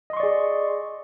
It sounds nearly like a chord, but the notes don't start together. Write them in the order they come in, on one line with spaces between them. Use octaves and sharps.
D#5 C6 C#6 D5 G#4